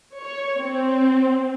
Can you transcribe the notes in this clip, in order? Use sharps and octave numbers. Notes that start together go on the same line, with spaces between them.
C#5
C4